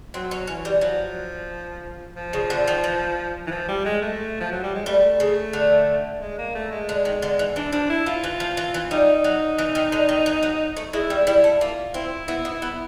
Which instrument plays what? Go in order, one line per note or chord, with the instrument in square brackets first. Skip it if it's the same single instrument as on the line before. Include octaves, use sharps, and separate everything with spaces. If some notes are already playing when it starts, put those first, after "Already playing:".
[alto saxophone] F#3 [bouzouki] C4
[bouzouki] C#4
[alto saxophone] E3 [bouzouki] C#4
[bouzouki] G3
[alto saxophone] F3 [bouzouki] F#3
[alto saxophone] F3
[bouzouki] C#3
D3
D#3
E3
[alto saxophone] E3
F3
G3
G#3
A3
F3
F#3
G3
G#3
[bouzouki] G3 [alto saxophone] A3
[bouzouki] C#3
D3
[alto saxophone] G#3
A#3
A3
G#3
[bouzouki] D3
D#3
D3
E3
[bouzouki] E3 [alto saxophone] D4
[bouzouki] F3 [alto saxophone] D4
[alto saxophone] E4
[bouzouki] F3 [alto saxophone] F4
[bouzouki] E3
F3
E3
E3
[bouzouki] G3 [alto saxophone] D#4
[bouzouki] F#3
E3
D#3
D3
D#3
E3
F#3
A3
[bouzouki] G#3 [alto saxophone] E4
[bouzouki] G3
[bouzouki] G3 [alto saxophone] E4
[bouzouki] A3
[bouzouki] A#3 [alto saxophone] F4
[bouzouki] C4 [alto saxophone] E4
[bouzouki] B3 [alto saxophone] E4
[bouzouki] B3
[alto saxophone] E4
[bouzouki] B3